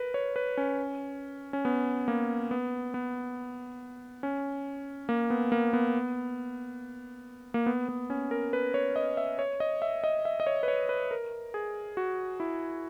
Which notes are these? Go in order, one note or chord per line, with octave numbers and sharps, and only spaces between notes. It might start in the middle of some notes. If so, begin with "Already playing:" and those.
Already playing: A#4 B4
C#5
B4
C#4
C#4
B3
A#3
B3
B3
C#4
A#3
B3
A#3
B3
A#3
B3
B3
C#4
A#4
B4
C#5
D#5
E5
C#5
D#5
E5
D#5
E5
D#5
C#5
B4
C#5
B4
A#4
G#4
F#4
E4